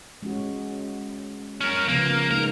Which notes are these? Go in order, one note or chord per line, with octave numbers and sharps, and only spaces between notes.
G#3 C#4 F#4
C#4 A#4
C#3 F3 A#3 B3
G#3 D#4 A#4